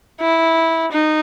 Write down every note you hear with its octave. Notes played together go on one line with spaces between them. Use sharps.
E4
D#4